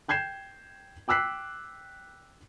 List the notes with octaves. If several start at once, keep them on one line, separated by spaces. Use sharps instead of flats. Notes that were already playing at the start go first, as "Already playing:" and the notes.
G5 G6 G#6 C7 E7
G5 D6 E6 F#6 B6 C7